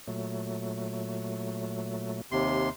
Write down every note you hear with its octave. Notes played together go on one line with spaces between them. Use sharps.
A#2 F#3 A3
D#2 C3 C6